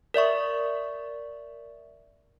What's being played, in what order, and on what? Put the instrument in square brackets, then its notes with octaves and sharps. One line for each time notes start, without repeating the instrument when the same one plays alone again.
[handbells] A#4 D5 E5 C#6